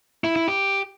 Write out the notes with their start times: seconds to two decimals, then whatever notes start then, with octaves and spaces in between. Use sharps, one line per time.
0.24 E4
0.36 E4
0.48 G4